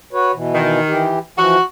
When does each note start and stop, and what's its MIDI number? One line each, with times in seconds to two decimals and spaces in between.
0.13 0.32 66
0.13 0.32 71
0.13 0.32 73
0.34 0.80 47
0.34 0.80 52
0.54 1.11 51
0.88 1.19 52
0.88 1.19 67
1.37 1.57 52
1.37 1.57 53
1.37 1.61 66